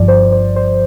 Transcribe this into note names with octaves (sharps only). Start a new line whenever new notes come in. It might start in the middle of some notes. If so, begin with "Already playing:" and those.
Already playing: G1 G2 F3 D5
C5
C5
C5